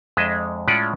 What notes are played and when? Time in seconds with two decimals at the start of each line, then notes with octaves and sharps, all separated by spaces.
0.17 F2 G#3 D4 G#4 D#5 E5
0.68 A2 G#3 C#4 F4 D5 F#5